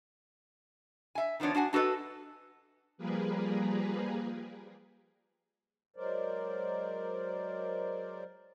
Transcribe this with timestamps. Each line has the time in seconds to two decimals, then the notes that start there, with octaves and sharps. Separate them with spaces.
1.15 E5 G#5
1.40 D#3 F3 B3 D4 C#5
1.55 D4 F#4 F#5 G#5
1.73 D4 F#4 A4 B4 D#5
2.98 F3 G3 A#3 G#4 A#4 B4
5.96 F#3 G#3 A#4 C5 D5